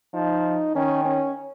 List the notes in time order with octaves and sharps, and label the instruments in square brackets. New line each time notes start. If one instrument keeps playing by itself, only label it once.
[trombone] F3 [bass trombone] D#4
[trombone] D#3 [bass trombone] C#4
[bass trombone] C#4